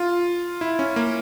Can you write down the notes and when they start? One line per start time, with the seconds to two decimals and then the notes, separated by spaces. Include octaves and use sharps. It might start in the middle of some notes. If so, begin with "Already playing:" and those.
Already playing: F4
0.61 E4
0.79 C#4
0.96 A#3